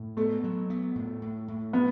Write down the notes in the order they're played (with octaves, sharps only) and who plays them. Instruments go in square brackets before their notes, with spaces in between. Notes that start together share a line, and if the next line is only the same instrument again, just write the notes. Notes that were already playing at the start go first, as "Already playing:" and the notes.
Already playing: [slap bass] A2
[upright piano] A3 [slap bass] B3
[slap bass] F#3
B3
A2
A2
A2
[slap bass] F3 [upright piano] B3